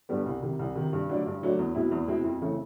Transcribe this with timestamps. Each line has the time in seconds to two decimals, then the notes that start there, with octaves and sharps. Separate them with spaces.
0.09 G2 D3 G3 B3
0.26 C2
0.42 C3 D#3
0.59 C2
0.75 C3 D#3
0.93 G2
1.09 D3 F#3 A3 D4
1.26 G2
1.42 D3 F#3 A3 D4
1.59 E2
1.75 B2 G#3 C4 E4
1.91 E2
2.08 B2 G#3 C4 E4
2.24 F2
2.41 C#3 E3 A3 C4